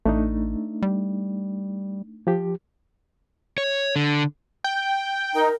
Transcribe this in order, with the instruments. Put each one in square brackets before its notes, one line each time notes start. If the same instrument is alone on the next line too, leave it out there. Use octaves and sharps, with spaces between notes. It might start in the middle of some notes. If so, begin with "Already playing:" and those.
[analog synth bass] A1 [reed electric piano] A3 D4 D#4
[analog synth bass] G3
[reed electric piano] F3 G4
[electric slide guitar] C#5
D3
[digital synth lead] G5
[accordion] D#4 [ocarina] A#4